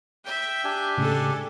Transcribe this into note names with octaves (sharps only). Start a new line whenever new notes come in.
E5 G5
D4 G4 G#5
A2 C#3 G#3 A4